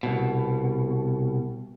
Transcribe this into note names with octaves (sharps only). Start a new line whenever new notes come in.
C2 B2